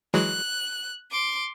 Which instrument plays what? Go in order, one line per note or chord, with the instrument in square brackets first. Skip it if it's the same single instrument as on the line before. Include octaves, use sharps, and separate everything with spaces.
[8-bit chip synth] E3 F#3 G#3 [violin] F#6
[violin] C6 D6